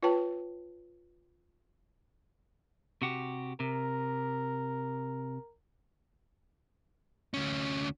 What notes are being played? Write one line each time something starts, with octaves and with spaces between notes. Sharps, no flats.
F4 B4 C#5 G5 A5
C3 F#4 G4
C3 A#4
D2 C#4